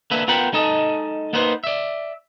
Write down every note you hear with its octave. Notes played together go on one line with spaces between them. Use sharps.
D3 A#3 B4 E5
B3 F4 A#4 F#5 G5 B5
G#3 D#4 A4 D#5
A#3 B3 D#4 B4 C5
D5 E5